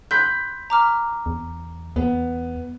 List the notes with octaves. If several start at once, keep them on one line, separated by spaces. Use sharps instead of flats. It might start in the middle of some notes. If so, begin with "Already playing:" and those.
B5 C6 F#6 G6 B6
A#5 D6 F6
E2
E2 B3